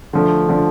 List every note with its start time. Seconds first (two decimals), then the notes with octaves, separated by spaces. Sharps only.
0.13 D3 F3 A3
0.49 D3 F3 A3